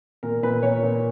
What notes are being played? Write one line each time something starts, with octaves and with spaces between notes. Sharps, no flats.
A#2 A#4
A#2 B4
A#2 C#5
A#2